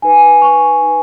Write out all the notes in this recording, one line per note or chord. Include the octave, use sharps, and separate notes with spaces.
D#4 B4 G#5
C#6
D#4 B4